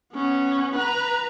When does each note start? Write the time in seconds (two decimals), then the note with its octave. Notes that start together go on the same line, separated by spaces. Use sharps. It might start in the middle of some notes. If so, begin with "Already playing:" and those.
0.13 B3 C#4
0.75 B4 A#5